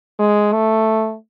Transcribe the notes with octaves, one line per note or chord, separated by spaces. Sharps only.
G#3
A3